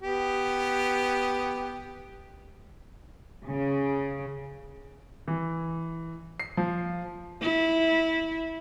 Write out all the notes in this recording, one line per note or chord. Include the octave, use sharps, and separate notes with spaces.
B3 G4
C#3
E3
C7
F3
E4